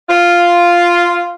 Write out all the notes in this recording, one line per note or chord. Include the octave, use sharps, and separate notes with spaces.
F4